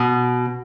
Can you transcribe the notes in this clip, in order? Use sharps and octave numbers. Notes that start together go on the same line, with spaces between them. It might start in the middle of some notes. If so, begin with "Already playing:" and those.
Already playing: B2